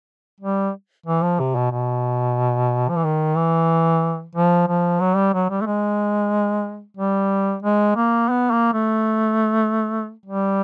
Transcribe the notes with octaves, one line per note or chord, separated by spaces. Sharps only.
G3
E3
F3
C3
B2
B2
F3
E3
D#3
E3
F3
F3
F#3
G3
F#3
G3
A3
G#3
G3
G#3
A#3
B3
A#3
A3
G3